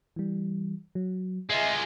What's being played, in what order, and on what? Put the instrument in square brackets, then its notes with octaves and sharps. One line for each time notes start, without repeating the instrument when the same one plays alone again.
[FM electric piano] E3 G3
F#3
[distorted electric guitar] G#3 F4 [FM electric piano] D#5 E5 G#5